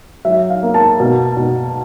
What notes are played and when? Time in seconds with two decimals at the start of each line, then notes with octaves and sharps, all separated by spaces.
0.25 F#3 E5
0.50 F5
0.63 A#3
0.74 A5
1.00 B2
1.37 B2